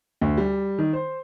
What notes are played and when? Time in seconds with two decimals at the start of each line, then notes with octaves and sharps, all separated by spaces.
0.21 D2
0.38 G3
0.79 D#3
0.93 C5